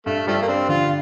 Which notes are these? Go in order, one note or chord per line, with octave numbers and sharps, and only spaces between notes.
G2 A3
F3 G3 A3
A#3
C4 D4
D3 F4